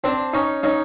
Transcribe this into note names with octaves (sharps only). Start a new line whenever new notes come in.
C4 D4
C#4 D#4
C#4 D#4